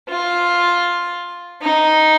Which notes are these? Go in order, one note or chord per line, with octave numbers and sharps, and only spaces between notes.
F4
D#4